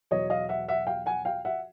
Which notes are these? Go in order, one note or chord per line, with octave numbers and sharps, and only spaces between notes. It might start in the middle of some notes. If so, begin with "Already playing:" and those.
E2 B2 F#3 C#5 D#5
D#5 F5
E5 F#5
E5 F#5
F5 G5
F#5 G#5
F5 G5
E5 F#5